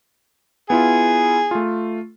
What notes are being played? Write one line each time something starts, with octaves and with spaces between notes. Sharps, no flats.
B3 E4 F4 G#4
A3 F4